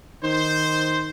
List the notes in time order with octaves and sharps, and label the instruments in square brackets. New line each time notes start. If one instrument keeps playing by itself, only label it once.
[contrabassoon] D#3 [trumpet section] C5